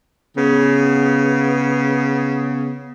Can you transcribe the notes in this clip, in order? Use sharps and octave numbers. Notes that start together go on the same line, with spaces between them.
C#3 B3